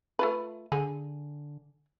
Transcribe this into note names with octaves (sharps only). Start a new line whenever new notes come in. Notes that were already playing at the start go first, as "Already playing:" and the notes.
A3 F4 B4
D3 G#4